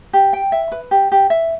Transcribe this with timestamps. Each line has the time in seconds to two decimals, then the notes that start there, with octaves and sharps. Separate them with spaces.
0.13 G4
0.33 G5
0.52 E5
0.72 B4
0.91 G4
1.12 G4
1.30 E5